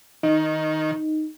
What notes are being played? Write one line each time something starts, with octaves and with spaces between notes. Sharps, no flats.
D#3 D#4